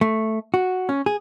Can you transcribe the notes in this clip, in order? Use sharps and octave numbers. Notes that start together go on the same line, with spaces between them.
A3
F#4
C#4
G#4